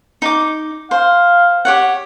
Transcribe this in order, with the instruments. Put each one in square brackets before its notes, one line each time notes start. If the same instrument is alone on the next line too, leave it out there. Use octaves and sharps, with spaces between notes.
[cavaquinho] D#4 D6
[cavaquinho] C5 [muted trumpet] F5
[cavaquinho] G4 C#5 F#5